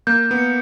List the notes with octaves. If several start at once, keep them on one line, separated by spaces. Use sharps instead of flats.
A#3 G6
B3
C#7